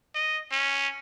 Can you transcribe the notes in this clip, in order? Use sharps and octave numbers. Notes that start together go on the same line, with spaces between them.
D#5
C#4